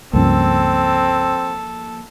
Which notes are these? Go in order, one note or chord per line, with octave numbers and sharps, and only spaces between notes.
C#2 G2 C#3 F3 A#3 C4 A4